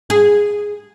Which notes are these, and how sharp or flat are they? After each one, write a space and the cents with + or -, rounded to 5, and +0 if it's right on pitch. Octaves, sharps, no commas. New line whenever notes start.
G#4 -5